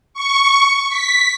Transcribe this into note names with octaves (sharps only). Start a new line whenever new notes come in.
C#6
B6